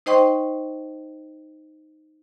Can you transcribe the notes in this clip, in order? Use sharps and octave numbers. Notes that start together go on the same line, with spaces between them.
D#4 C5 D#5 G5 C6 C#6